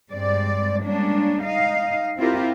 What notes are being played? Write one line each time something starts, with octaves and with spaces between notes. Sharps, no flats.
G2 G#3 C4 D5
G3 G#3 A#3 C#4 D4
D#4 D#5 F5
C4 E4 F4 G4 A#4